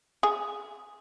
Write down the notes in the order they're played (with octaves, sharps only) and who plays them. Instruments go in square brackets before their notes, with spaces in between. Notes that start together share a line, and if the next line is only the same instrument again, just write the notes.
[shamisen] G#4